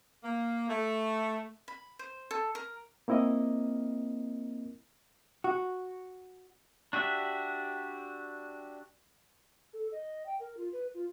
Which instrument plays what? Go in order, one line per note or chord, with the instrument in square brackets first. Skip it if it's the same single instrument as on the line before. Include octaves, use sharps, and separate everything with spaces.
[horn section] A#3
A3
[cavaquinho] B5
C5
A4
A#4
[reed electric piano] A#3 C4 E4 A#4 D#5
[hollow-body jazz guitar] F#4
[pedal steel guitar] D4 F#4 G4 E5
[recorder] A4
D#5
G5
A#4
F4
B4
F4